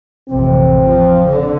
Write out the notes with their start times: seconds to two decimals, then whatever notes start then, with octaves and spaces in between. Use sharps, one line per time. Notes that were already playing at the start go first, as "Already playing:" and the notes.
0.30 A1 F2 C3 C4
0.82 F3
1.29 D3